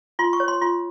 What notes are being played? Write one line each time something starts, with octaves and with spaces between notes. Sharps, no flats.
F4 C6
C#6
C#5
C6
F4 C6